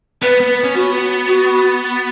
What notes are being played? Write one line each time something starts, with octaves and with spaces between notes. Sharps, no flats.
B3 B4
B3
C#4
B3 F#4
F#4